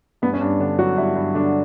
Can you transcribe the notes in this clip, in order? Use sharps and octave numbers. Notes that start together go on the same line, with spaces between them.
G2 B3
C#4
G2 D4
D3 D4
F#3 F#4
G2 E4
G2
D3 D4